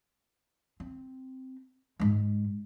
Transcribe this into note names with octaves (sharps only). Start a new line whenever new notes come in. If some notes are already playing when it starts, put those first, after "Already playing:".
C4
G#2 G#3